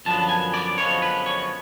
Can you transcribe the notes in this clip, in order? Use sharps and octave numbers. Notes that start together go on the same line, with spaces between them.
F#2 D3 F3 B3 A5
G#5
D5
F#2 D3 F3 G#3 B3 C#5
B4
C#5